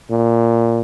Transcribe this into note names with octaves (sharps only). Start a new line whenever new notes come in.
A#2